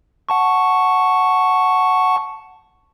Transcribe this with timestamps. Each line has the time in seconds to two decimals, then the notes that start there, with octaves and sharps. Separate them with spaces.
0.29 F#5 A5 C#6